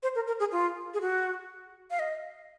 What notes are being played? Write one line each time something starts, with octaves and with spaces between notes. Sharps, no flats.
C5
A#4
A#4
G#4
F4
G#4
F#4
F5
D#5